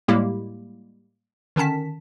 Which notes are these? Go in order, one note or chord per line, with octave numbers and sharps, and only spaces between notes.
A2 G3 G#3 A#3 E4 G4
D3 D#3 C#4 A5 B6